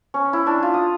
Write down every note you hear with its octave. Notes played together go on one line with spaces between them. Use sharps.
C#4
E4
D4
F4
D#6